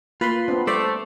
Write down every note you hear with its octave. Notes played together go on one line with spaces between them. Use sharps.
A#3 F4 B4 B5 C6
B3 C4 D4
G3 A3 A4 C5 D5 B5